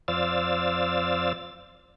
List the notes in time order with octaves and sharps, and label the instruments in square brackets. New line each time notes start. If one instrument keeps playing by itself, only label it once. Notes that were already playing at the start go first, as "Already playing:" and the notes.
[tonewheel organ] F2 C5 D5 F5 E6 A6